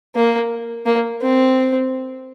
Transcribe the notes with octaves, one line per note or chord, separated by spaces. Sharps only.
A#3
A#3
C4